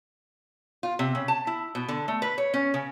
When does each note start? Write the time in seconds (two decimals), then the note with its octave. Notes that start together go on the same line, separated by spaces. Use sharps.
0.83 F4
0.99 C3
1.15 C#3
1.28 A5
1.47 E4
1.75 B2
1.89 D3
2.08 A3
2.22 B4
2.38 C#5
2.54 C#4
2.74 C#3